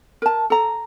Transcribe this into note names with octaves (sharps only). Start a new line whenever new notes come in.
A#4 A5
A4 A#5